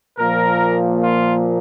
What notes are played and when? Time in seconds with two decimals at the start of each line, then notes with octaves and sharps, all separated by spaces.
0.19 A#2 F3 A#3 A#4
1.04 F4